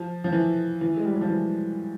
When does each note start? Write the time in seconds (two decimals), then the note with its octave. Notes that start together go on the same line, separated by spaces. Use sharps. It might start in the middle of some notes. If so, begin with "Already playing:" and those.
Already playing: F3
0.24 F3
0.32 E3
0.81 E3
0.97 G#3
1.05 G3
1.13 F#3
1.21 F3
1.30 E3